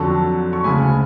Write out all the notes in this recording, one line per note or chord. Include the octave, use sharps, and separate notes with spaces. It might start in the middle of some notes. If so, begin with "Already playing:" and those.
Already playing: F2 D3 F#3 A5 C#6
C#6
D2 C#3 G#3 G#5 B5